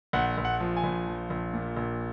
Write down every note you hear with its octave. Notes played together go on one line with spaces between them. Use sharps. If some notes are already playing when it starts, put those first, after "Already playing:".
A#1 F#5
A#1
F#5
F3
G#5
A#1
F3
A#1
A#2
A#1